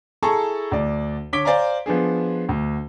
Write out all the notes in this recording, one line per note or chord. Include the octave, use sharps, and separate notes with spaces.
E4 G#4 A4 A5 A#5 C#6
D2 D5
D3 C#5 D6 B6 D7 G7
C5 D5 F5 G#5 A#5
F3 B3 D4 G#4
D2